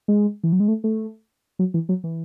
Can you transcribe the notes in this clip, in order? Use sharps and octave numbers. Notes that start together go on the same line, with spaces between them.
G#3
E3
F#3
G#3
A3
A3
F#3
E3
F#3
E3